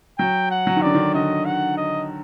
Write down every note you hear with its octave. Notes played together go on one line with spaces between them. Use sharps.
F#3 G5
F#5
F#3
D#3
D3 D5
D#3
D3 D#5
F#5
D#5